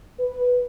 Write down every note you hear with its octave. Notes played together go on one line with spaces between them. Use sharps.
B4